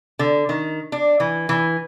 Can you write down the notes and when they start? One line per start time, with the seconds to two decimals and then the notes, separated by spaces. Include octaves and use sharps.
0.19 D3
0.49 D#3
0.92 D4
1.20 E3
1.49 E3